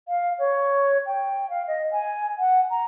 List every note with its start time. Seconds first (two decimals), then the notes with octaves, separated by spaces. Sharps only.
0.08 F5
0.39 C#5
1.06 G5
1.50 F5
1.68 D#5
1.92 G#5
2.39 F#5
2.71 A#5